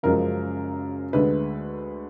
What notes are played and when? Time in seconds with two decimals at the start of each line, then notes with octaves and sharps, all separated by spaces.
0.03 F#1 F#2 F3 G#3 A#4
1.13 D2 D3 G#3 B4